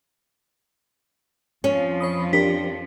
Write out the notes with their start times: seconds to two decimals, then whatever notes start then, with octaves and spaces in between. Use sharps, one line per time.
1.64 F2 F3 C#4
2.00 C#5 B5 D#6
2.33 D4 G4 A#4 B6